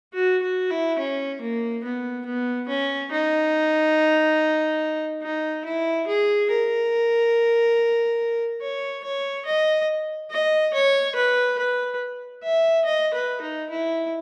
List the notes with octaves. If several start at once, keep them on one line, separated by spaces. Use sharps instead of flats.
F#4
F#4
E4
C#4
A#3
B3
B3
C#4
D#4
D#4
E4
G#4
A#4
C#5
C#5
D#5
D#5
C#5
B4
B4
E5
D#5
B4
D#4
E4